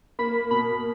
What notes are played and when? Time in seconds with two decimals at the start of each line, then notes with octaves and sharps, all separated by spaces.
0.19 A#3 B5
0.51 B2 B5